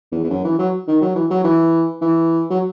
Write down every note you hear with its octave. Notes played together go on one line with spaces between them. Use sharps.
E2
E2
F#2
E3
F#3
D#3
F#3
E3
F#3
E3
E3
F#3